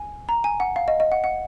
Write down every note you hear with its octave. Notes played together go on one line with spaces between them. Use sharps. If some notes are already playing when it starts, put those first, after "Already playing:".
Already playing: G#5
A#5
G#5
F#5
F5
D#5
D#5
F#5
F#5